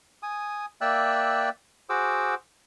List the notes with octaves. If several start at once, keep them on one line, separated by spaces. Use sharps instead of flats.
G#5 D#6
A#3 D5 E5 G5 E6 F#6
F#4 G#4 C5 F#5 D6 E6